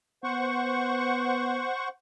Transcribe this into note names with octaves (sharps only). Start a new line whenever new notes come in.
B3 C5 F#5 C#6